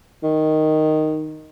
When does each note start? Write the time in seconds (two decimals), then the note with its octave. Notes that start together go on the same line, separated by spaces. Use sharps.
0.23 D#3